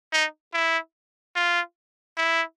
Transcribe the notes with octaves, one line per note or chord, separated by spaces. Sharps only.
D#4
E4
F4
E4